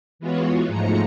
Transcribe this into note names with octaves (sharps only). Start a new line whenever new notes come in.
E3 G#3 B3 F4 F#4 C#5
G#2 F3 G#3 A3 A#5 C#7